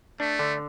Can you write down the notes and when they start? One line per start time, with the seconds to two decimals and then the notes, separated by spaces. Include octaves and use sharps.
0.20 A3 D4
0.39 D3